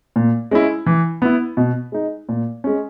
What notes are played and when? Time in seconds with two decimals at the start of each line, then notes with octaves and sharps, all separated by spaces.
0.16 A#2
0.51 G#3 C#4 E4
0.86 E3
1.22 B3 E4
1.57 B2
1.92 G#3 D#4
2.29 A#2
2.64 G#3 C#4